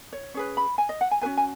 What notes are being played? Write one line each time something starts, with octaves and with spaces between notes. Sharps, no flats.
C#5
C#4 G#4 B4 C#5
B5
G#5
D#5
F#5
G#5
C#4 F#4 B4 G#5
G#5